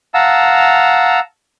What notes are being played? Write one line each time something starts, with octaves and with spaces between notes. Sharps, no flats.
F5 F#5 A5 A#5 E6